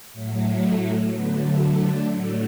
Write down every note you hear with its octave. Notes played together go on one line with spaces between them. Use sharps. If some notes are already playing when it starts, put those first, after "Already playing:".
A2 F#3 A3
D3 F#3 A3 B3
D4
A2 F#3 A3